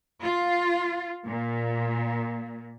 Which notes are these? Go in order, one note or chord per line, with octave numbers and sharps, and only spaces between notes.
F4
A#2